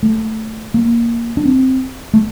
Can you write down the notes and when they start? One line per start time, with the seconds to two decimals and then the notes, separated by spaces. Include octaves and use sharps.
0.03 A3
0.74 A#3
1.37 D4
1.46 C4
2.14 A3